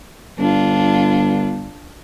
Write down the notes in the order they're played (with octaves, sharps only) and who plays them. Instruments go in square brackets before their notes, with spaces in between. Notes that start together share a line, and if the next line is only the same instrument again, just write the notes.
[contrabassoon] G1 [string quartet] D4 F4